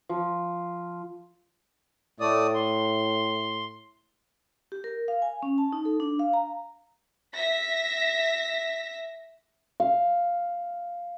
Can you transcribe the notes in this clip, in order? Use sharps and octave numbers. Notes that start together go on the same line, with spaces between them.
F3
A2 A3 D5 D#6
C6
G4
A#4
F5
G#5
C#4
A5
D#4
A4
D4
F5
A#5
E5 A#6 B6
F5